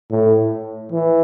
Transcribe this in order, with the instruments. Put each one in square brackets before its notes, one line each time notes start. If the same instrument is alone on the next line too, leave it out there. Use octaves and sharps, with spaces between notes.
[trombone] A2
E3